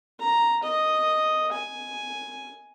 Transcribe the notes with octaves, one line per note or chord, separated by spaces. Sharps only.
A#5
D#5
G#5